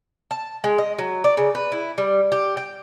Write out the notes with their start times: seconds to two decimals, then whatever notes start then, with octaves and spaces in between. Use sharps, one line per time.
0.31 A5
0.64 G#3
0.78 D#5
0.98 F#3
1.24 D5
1.37 C#3
1.55 B4
1.72 E4
1.98 G3
2.32 G4
2.57 G5